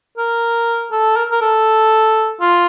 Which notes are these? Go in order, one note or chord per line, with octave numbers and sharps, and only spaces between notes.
A#4
A4
A#4
A#4
A4
F4